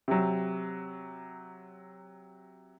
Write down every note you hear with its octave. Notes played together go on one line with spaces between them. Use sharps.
C3 F#3